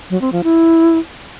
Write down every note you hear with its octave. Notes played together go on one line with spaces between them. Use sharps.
F#3
C4
F3
E4